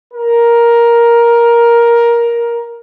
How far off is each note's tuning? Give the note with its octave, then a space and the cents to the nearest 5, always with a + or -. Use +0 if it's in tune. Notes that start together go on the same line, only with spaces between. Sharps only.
A#4 +10